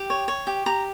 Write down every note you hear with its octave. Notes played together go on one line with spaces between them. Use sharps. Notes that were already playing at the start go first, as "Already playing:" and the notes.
Already playing: G4 G5
C#5
C#5
G4
G4 A#5